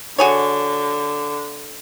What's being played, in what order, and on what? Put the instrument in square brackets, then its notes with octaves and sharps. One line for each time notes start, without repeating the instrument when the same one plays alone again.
[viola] D3 [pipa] F#4 G#4 C#5